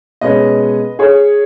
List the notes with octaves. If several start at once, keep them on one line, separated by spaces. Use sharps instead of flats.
B2 G#3 C#4 B4 D#5
G#4 C#5